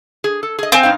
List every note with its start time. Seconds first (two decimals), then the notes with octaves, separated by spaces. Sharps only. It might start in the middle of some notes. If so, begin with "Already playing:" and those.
0.24 G#4
0.43 A4
0.59 G#4 D#5
0.72 C4 F5 G#5
0.83 G2 D#4 F5